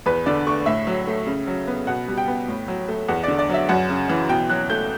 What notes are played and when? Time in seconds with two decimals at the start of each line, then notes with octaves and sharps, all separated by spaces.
0.06 E2 B4
0.26 D3 D5
0.47 A3 C#6
0.66 A2 E5
0.87 F#3
1.07 A3
1.27 C#3
1.47 F#3
1.67 B3
1.87 B2 F#5
2.08 G3
2.18 G5
2.28 B3
2.48 A2
2.68 F#3
2.88 A3
3.08 E2 F#5
3.23 D3 D5
3.39 D5
3.49 F#3 E5
3.69 F#2 F#5
3.89 C#3
4.09 E3
4.29 B2 G5
4.49 F#3 F#6
4.70 A3 G6